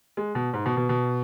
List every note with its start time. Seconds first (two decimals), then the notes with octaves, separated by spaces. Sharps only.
0.17 G#3
0.35 B2
0.53 G#2
0.66 B2
0.77 B2
0.89 B2